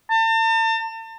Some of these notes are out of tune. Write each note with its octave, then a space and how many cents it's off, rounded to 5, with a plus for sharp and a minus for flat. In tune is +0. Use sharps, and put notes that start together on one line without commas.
A5 +40